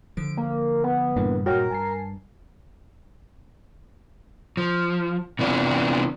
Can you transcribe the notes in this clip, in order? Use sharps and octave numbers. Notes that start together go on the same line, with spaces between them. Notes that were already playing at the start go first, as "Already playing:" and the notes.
D3 F3 D7
A#3
B3
G2 A#2 C#3 E3 A#3 D4
G2 A#2 F#4 A#4 C#5 G5
G2 G#5 A5 C7
F3
C3 E3 B3 D4 F4